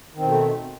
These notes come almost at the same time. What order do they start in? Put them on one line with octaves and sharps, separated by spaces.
D#3 C4 B2 A3